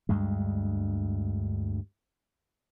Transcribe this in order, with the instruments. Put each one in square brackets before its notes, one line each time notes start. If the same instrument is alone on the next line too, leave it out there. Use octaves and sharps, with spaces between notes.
[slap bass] D2 G2 G#3